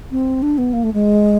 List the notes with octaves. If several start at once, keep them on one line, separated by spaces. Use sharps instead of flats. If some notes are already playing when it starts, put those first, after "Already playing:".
C4
D4
B3
A#3
A3
G#3